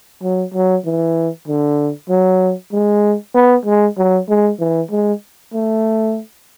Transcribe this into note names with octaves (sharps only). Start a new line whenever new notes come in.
F#3
F#3
E3
D3
F#3
G#3
B3
G#3
F#3
G#3
E3
G#3
A3